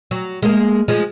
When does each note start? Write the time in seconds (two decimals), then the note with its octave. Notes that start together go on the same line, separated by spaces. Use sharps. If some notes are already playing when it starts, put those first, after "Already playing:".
0.11 F#3
0.42 G#3 A#3
0.88 F3 G#3